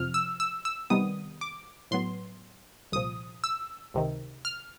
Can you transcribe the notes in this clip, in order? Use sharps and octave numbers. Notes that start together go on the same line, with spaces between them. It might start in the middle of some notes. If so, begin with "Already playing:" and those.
Already playing: F2 C3 F3 F6
E6
E6
E6
C3 D#3 G3 B3 D#6
D6
A2 F#3 B3 C6
C2 A#2 F3 D#6
E6
C#2 C3 D#3
F6